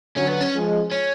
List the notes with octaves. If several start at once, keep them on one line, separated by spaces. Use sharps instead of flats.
D3 F#3 C#4
B3
C#4
F3 G#3
C#4